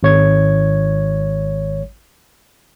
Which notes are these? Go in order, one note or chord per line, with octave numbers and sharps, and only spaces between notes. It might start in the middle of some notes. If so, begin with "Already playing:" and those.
G#1 C#5 G#6